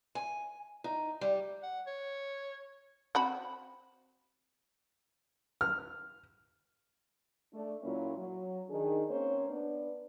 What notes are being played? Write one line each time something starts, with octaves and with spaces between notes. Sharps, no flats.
G#5
D#4
G3
F#5
C#5
C4 F#4 B5
F6
A3 D4
A#2 F#3 A#3 C#4 E4 F4
F#3
D#3 D4 G#4
A#3 C4 C#4 C5 C#5
B3 D4 B4